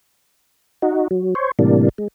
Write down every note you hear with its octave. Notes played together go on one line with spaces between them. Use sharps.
D#4 F#4
F#3
C5 C#5
A2 C3 E3 G3 A#3 D4
G#3